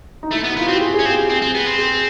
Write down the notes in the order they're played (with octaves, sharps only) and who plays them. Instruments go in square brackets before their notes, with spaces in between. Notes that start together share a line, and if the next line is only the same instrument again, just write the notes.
[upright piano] D#4
[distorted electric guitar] A3 [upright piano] E4
[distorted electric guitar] B3
[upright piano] E4
[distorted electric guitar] B3 [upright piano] F4
[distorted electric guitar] C4 [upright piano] F#4
[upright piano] G4
G#4
[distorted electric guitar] C#4 [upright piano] G#4
[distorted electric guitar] C4 [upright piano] G4
[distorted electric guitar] C4 [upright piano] G#4
[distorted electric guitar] C4
B3
C4
[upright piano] G#4